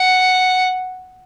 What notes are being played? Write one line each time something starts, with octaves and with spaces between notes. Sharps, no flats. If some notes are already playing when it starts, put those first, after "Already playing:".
Already playing: F#5